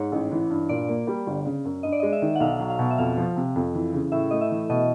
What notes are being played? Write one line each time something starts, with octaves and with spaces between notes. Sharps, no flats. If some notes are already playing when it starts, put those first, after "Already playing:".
Already playing: G#2 C#5
A1
E3
G2
A#2 D5
A#3
G3
G1
C#3
F#2
G2 D#5
D5
D#5
G#3
E5
D#3
F#5
B1 F5
F#3
F5
B2
E5
F2 F5
F3
C3
F2
E3
C#3
A2 E5
A3 D#5
E5
E3
B2 D#5